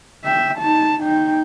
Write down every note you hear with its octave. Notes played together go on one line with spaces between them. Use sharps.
E5 G5
D#4 A5
D#4 G5